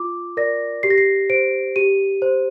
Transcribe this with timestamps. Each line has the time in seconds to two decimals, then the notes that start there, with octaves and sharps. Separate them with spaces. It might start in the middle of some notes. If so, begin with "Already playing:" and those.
Already playing: F4 D6
0.37 A#4 D5 A#6
0.83 G4 C7
0.90 A#6
0.98 C7
1.30 C5 D7
1.76 G4 D#7
2.22 C5